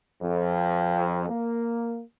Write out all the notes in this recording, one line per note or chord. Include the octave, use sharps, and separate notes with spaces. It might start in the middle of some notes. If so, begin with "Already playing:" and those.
F2
A#3